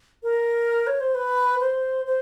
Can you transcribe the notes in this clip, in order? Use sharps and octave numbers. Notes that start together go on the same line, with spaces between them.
A#4
C#5
C5
B4
C5
C5